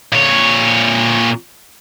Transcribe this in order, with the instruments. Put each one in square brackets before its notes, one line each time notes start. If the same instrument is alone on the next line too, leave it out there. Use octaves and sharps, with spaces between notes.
[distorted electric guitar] A#2 C#5